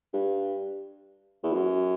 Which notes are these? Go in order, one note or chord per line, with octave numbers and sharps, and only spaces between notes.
G2
E2
F#2